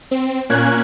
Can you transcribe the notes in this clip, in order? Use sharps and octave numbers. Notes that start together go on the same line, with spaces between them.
C4
A#2 A#3 C#4 F#6 G#6